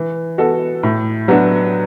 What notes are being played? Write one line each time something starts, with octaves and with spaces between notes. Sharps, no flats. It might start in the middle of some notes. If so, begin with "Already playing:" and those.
Already playing: E3
B3 F#4 A4
A2
F#3 B3 D4 F#4